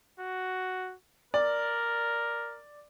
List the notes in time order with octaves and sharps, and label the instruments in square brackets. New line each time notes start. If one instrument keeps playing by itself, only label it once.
[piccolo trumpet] F#4
[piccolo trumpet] A#4 [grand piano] D5